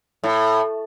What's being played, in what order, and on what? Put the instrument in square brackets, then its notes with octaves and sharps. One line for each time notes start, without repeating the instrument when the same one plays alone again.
[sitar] A2